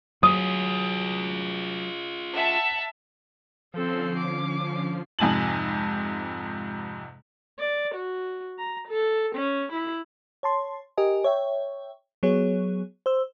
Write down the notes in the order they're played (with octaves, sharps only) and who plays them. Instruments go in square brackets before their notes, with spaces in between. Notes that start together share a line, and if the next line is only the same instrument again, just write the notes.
[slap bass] F#3 [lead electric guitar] F4 G#4 [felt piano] D#6
[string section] E5 F#5 A5
[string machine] D3 C#4 C7 [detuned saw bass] F3 [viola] C4 A4
[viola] D6
[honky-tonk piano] F2 G#2 C3 G#5 A5 F#7
[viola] D5
F#4
A#5
A4
C#4
E4
[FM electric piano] C#5 A5 C6
G4 A#4 D#5 G#5
C#5 E5 G5
F#3 B3 G#4 C#5
C5 E6